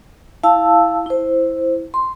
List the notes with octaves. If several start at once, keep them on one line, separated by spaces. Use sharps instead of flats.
E4 F5 A5 E6
E4 C5
C6